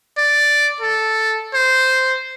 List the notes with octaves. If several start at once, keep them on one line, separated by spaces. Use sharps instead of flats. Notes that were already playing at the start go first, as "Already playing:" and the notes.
D5
A4
C5